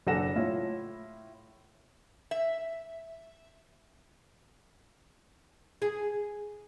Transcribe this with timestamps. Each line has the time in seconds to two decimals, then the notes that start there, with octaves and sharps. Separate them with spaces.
0.07 F#1 D4 A4 F#5 A#6 E7
0.36 A2 E4 F4 C#5
2.31 E5
5.82 G#4